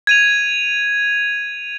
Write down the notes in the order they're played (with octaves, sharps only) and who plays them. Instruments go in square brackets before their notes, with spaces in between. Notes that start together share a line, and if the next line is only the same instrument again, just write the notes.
[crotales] G#6 D#7 F7